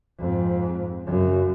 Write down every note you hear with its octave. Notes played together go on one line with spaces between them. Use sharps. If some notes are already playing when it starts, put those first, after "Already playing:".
F2 G#2
F#2 C#3